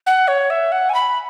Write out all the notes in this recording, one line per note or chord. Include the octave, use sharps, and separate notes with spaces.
F#5
C#5
E5
F#5
G#5
B5